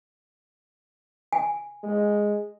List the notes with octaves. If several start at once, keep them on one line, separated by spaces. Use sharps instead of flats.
G#5
G#3